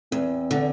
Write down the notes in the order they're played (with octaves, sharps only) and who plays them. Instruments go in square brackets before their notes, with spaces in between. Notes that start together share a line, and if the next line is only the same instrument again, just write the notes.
[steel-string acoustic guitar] E2 [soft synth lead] C4
[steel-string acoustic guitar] D3